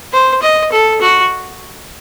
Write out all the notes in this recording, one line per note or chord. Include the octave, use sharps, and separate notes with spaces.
C5
D#5
A4
F#4